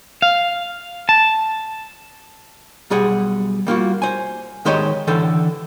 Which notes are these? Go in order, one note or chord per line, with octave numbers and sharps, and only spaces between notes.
F5
A5
B1 G3 G#4 F#5
G3 A#3 F4 F#4
C5 G#5
D#3 G#3 G4 C5 C#5 D#5
D3 E3 A4 G5